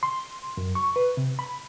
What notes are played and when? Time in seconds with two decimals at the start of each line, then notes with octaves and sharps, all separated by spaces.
0.03 C6
0.57 F#2
0.75 C#6
0.96 B4
1.17 C3
1.39 B5